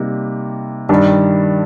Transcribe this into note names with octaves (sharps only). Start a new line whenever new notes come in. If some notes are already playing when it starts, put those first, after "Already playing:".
Already playing: C3 G3 A#3 D#4
G2 D#3 G3 D4